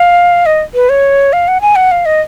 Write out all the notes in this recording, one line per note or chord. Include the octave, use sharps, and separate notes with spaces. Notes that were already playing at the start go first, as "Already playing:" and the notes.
Already playing: F5
D#5
B4
C#5
F5
F#5
G#5
F#5
F5
D#5